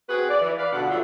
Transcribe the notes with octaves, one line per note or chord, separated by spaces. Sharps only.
C4 F#4 G#4 B4
D5
E3
B4 D5 F5
G2 B2 D3 F3 D4 F#5
F#3 G3 A3 E4 F4